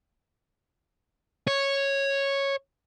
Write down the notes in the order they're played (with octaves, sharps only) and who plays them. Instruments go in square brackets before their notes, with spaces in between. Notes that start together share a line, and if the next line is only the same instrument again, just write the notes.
[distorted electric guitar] C#5